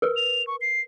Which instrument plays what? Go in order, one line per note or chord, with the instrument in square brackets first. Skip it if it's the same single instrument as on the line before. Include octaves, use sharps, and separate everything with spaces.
[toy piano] A#4 B4
[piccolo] F7
C#6
C7